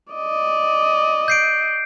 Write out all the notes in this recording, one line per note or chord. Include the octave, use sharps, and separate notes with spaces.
D5 D#5
G6 C7 D7